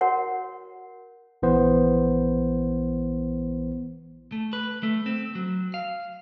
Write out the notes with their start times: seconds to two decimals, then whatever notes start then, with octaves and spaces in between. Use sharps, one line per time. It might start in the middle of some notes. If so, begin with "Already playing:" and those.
0.01 F#4 A#4 C#5 F#5
1.42 A#1 E3 B3 C5
4.32 A3
4.53 B4
4.83 A3
5.06 C4
5.35 F#3
5.74 F5